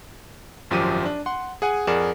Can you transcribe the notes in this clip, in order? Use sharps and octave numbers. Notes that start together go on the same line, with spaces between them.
G#1 F#2 F3 G4 D6 D#7
D4
F#5 C6
G#4 F#5 G#5
F2 G#4 A#4 D5 F#5 E7